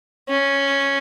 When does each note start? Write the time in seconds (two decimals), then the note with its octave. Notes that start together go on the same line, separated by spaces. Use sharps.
0.29 C#4